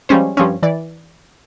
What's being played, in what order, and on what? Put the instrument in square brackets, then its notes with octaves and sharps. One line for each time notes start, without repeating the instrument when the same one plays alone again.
[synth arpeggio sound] F3 G3 G#3 C#4 C5
G2 F3 C4 C#4
E3 D5